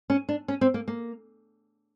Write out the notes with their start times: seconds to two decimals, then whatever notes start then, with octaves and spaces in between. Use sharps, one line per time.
0.10 C#4
0.29 D4
0.48 C#4
0.61 C4
0.74 A#3
0.88 A#3